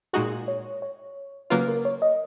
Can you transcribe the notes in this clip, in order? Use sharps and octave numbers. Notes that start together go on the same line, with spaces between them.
A#2 G#3 D#4 F#4 G#4
C#5
C#5
C#3 F#3 A#3 F4 B4
A#4
C#5
D#5